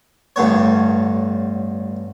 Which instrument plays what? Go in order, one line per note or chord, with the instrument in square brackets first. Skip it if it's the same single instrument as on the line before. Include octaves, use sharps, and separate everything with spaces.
[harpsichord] A1 G2 D3 B3 C#5